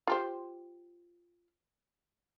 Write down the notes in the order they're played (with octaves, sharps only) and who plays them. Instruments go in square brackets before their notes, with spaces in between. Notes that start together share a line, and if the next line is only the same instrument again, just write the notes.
[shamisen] F4 G4 C5